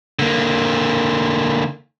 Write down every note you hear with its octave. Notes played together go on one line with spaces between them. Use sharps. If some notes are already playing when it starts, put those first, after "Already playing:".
D3 A#3